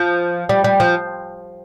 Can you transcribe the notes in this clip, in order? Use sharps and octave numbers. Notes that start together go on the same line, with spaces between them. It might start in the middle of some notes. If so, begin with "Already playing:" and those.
Already playing: F3
G3
G3
F3